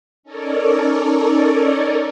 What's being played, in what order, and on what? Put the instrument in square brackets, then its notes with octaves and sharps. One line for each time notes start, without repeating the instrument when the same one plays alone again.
[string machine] C#4 D#4 A4 A#4 C#5 D5